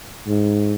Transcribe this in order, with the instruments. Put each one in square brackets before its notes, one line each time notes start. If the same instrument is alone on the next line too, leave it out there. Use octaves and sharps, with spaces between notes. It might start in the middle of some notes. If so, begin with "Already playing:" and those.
[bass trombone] G#2